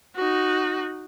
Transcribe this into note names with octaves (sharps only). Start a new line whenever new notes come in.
D#4 F#4